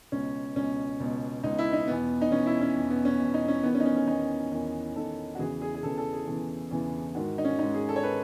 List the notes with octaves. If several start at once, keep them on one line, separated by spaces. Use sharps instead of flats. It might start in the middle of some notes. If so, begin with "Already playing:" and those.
C#2 B2 C#4
C#2 B2 C#4
C#2 B2
C#2 B2 D#4
E4
D#4
E2 B2 B3
D#4
E2 B2 C#4
E4
C#4
E2 B2
B3
C#4
E2 B2
D#4
C#4
E2 D#3 B3
C#4
D#4
C#4
C#4
E2 D#3 D#4
E2 D#3
E2 D#3 A4
F#4
E2 C#3 E3 G#4
G#4
G#4
E2 C#3 E3 A4
A4
G#4
E2 C#3 E3
E2 C#3 E3
G#2 D#3 F#4
D#4
C#4
G#2 D#3 D#4
G#4
A4
C#5
D#3 B4